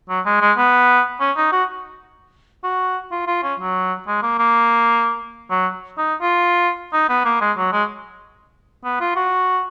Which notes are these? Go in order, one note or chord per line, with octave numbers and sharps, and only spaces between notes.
F#3
G#3
G#3
B3
C#4
D#4
F#4
F#4
F4
F4
C#4
F#3
G#3
A#3
A#3
F#3
D#4
F4
D#4
B3
A#3
G#3
F#3
G#3
B3
F4
F#4